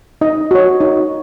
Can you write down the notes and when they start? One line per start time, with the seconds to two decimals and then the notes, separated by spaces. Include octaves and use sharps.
0.21 D#4 D#5
0.51 F#4 C#5
0.80 D#4